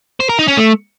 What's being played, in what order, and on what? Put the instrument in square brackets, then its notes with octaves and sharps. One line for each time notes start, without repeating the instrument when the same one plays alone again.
[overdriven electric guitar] C5
A#4
D#4
C#4
A3